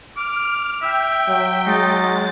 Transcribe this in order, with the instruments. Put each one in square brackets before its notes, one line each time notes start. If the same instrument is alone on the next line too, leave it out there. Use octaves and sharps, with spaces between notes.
[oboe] D6 [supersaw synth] F6
[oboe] E5 [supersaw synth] G5
[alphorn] F#3
[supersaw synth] G#3 A6 [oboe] D#4